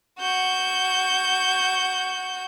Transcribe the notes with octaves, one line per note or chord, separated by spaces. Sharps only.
F#4 G6